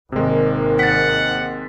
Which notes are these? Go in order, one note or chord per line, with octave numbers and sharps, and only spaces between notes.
G#1 C3 D#3 G#3 A#3
F#5 A6 B6